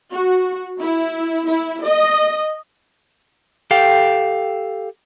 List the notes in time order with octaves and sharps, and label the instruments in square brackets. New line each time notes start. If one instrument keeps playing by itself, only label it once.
[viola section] F#4
E4
E4
D#5
[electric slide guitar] G4 A4 F5 G5